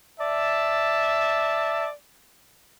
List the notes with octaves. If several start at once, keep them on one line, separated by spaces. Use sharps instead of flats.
D5 E5 A5